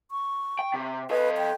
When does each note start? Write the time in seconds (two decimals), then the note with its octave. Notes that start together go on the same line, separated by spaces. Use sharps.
0.11 C#6
0.59 G5
0.74 C3
1.11 A4 B4 D#5
1.37 G5